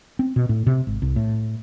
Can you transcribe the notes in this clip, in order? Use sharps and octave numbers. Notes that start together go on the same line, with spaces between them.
C4
B2
A2
C3
G#1
C2
A2